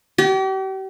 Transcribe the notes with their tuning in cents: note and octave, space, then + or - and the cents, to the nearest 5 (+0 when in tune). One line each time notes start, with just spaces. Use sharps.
G4 -40